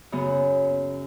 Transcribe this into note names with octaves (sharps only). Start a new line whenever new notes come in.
F#2 C#3 B3